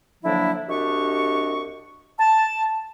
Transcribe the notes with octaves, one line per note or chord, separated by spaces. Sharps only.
D3 F3 F#3 A#3 D4 E4
C2 D4 F#4 G4 D#5 C#6
A5